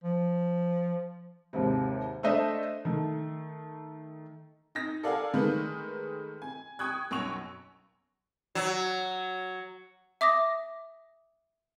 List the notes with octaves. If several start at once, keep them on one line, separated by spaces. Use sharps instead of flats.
F3
D#2 G#2 C3
A3 D4 C5 D#5 E5
D#3 A3
D#4 A#6
A4 A#4 D5 F5 F#5 G#5
D#3 G#3 A3 D#4 B4
G#5
G5 C#6 D#6 F#6 G#6
B1 F#2 C#6 F7
F#3
E5 D6 D#6 A#6